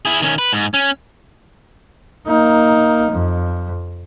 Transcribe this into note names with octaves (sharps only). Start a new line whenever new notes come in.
E4 G#4
D#3 C#4
B4
G#2
C#4
A#3 D#4
F2